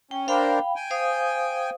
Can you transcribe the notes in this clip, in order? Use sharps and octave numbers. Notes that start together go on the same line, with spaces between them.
C#4 G5
D4 A#4 C5 F5 G5 B5
G5 G#5
C5 F5 D#6